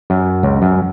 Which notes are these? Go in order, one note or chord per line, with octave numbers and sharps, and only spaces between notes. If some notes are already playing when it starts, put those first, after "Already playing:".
F#2
C#2
F#2